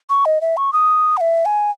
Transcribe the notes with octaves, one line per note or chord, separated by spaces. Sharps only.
C#6
D#5
E5
C#6
D#6
F#5
E5
G#5